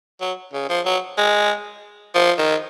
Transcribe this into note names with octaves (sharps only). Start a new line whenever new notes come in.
F#3
C#3
F3
F#3
G#3
F3
D#3